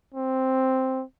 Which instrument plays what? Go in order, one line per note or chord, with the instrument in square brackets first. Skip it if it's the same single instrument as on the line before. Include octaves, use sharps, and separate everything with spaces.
[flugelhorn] C4